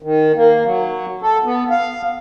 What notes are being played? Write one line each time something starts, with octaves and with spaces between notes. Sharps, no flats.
D#3
A#3
F#3
A4
B3
F5